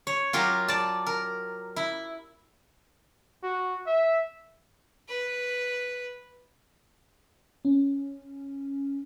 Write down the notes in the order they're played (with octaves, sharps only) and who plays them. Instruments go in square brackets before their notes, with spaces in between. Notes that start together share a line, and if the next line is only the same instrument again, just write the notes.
[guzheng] C#5
F#3 F4 G4 A#4
D5 A5
A#4
E4
[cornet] F#4
E5
[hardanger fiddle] B4
[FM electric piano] C#4